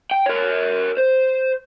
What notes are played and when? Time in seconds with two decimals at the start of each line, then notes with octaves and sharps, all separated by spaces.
0.11 G5
0.26 A#4 C#5
0.98 C5